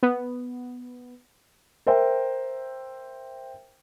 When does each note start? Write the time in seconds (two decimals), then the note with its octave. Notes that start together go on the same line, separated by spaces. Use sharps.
0.03 B3
1.86 A#4 C5 E5 G5